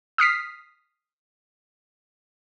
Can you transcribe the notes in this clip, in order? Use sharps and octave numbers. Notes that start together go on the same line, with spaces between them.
D#6 F6 B6 C7